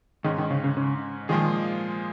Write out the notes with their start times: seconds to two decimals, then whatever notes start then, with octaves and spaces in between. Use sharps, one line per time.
0.24 G#2 D#3 G#3 C#4
0.38 D#3
0.51 C#3
0.64 C#3
0.77 C#3
1.29 A#2 D#3 F3 G#3 F4 G#4